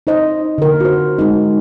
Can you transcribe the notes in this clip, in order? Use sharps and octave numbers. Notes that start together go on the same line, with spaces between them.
D#4 C5 D#5
D3 A#4
F#4 C5
G#3 D#4